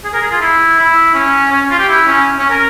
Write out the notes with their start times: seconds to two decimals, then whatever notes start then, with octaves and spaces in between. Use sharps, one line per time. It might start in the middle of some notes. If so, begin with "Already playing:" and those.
0.04 G#4
0.14 A#4
0.22 G#4
0.32 F4
0.41 E4
0.79 E4
1.15 C#4
1.52 C#4
1.71 F4
1.79 G4
1.89 E4
2.07 C#4
2.39 C#4
2.50 A#4